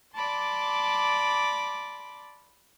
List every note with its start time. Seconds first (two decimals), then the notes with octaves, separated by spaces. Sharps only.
0.15 D5 A5 B5 C6 D6